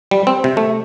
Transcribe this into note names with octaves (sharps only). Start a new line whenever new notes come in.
G3
C4
C3
A3